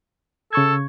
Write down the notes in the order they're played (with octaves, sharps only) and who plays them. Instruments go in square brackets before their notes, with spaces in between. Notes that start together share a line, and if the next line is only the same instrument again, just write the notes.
[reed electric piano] C#3 C#6 G#6 [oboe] A4